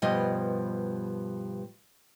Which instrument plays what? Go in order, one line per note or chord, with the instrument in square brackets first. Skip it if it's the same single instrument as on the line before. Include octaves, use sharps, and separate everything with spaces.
[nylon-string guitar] G2 B2 F3 G3 D#5